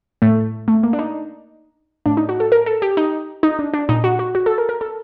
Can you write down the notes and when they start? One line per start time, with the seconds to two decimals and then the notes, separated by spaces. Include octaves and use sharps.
0.22 A2 A3
0.68 A3
0.83 A#3
0.93 D4
0.99 D#4
2.06 A2 D4
2.17 D#4
2.29 F#4
2.40 A4
2.52 A#4
2.66 A4
2.82 G4
2.97 D#4
3.43 D#4
3.59 D4
3.74 D4
3.89 A#2 D#4
4.04 F#4
4.19 F#4
4.35 F#4
4.46 A4
4.58 A#4
4.69 A#4
4.81 A4